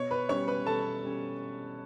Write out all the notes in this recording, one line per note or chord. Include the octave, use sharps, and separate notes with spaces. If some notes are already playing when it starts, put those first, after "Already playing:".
Already playing: B2 C#5 C#6
B4 B5
G3 C#4 C#5 C#6
B4 B5
B2 A4 A5
G3 C#4